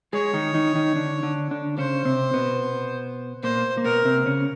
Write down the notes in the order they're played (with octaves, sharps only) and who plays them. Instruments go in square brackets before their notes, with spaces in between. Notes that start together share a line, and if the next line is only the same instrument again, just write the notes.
[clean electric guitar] G#3 G#4 [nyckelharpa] C#5
[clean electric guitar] D#3 D#4
D#3 D#4
D#3 D#4
D3 D4
D3 D4
D3 D4
[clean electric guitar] C#3 C#4 [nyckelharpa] C5
[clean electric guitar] C3 C4
B2 B3
[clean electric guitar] A#2 A#3 [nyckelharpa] C5
[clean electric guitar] A#3
[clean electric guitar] B2 B3 [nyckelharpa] A#4
[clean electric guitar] C3 C4
C#3 C#4